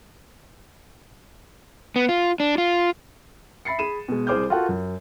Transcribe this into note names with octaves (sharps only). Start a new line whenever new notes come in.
B3
F4
D4
F4
E5 B5 A6 C7 C#7
G#4 B5 D#7 E7
B2 G#3
C2 G#4 C5 D6 F6 G6
F4 F#4 A4 A#4 F#5
F#2